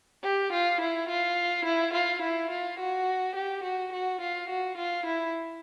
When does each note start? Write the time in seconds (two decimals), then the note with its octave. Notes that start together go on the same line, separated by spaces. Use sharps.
0.24 G4
0.53 F4
0.81 E4
1.09 F4
1.65 E4
1.94 F4
2.22 E4
2.51 F4
2.80 F#4
3.36 G4
3.64 F#4
3.93 F#4
4.21 F4
4.50 F#4
4.78 F4
5.06 E4